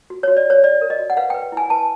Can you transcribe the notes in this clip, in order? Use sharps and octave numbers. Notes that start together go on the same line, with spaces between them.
F#4
C#5
F#4
D5
F#4 C#5
C#5 D5
A#4
D#5
F#4
F#5
B4 F5
B4 G5
E4 G#5
B4 A5